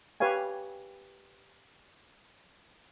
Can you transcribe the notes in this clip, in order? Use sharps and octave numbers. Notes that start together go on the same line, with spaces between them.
G4 B4 C#5 F5 G#5